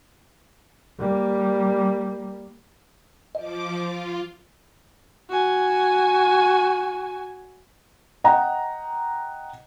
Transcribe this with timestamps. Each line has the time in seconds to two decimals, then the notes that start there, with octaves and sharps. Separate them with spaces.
0.99 G3 A#3
3.35 F3 D#5 D6
3.78 F4
5.30 F#4 G#5
8.24 D#5 F#5 G5 A#5